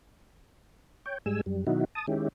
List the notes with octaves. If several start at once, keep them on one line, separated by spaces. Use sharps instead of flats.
C#5 G5
G#2 G3 G#3 G#5 E6
F#2 G3
B2 D#3 F#3 D#4 E4 F#4
A5 D#6
D#3 G#3 C#4 E4 G4